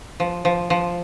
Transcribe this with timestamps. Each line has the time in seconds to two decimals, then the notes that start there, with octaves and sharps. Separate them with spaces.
0.20 F3
0.45 F3
0.70 F3